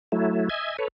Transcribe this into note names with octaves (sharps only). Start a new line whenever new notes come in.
F#3 A3 E4
D#5 E5 G#5
A4 B4 C#5